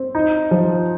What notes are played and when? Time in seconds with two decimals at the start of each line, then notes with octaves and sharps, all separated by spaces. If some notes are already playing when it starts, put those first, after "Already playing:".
Already playing: C4
0.15 D#4
0.51 F3